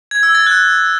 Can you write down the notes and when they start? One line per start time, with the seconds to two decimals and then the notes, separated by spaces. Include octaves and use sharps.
0.11 G#6
0.23 E6
0.35 A6
0.46 F#6